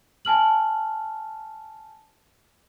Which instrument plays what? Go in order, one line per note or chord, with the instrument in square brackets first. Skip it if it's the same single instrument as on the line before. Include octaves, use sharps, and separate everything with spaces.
[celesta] G#5 A5 F6 F#7